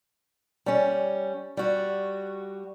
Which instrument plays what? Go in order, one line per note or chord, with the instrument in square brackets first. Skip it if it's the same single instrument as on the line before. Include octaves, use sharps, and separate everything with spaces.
[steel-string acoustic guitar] G3 C#4
G3 F#4